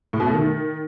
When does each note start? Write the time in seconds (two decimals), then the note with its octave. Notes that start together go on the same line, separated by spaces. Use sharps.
0.13 A2
0.20 B2
0.27 A3
0.33 D#3